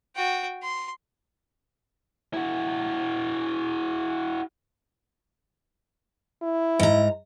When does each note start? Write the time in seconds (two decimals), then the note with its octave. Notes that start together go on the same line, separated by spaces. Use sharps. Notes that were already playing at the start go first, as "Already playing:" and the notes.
0.15 F#4 G5
0.62 C6
2.33 E4 F#4
6.42 E4
6.80 G#2 A#5